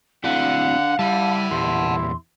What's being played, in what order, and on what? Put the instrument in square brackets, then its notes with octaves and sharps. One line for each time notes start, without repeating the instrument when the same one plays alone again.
[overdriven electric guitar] D3 [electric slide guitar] C4 E4 F#4 [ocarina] F5 [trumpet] F#5
[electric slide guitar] G3 [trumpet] E4 [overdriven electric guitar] F#5 A5
[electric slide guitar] E2 A#2 G4 [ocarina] C6